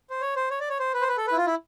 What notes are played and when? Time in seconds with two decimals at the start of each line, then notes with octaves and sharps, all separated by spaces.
0.10 C5
0.21 C#5
0.36 C5
0.50 C#5
0.60 D5
0.69 C#5
0.79 C5
0.94 B4
1.01 C5
1.08 B4
1.17 A4
1.27 B4
1.32 E4
1.37 F4
1.46 E4